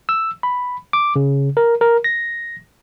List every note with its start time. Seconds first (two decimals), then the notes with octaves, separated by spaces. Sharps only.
0.09 E6
0.43 B5
0.93 D6
1.16 C#3
1.57 A#4
1.81 A#4
2.04 A#6